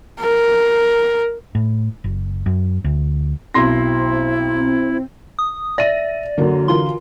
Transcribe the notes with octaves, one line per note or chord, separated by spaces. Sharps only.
A#4
A2
F#1
F#2
D2
B1 C4 E4 C6 A#6
D#6
D5 E5 A#6 D#7
F#2 D3 A#3 F#4
E3 F4 A#4 C6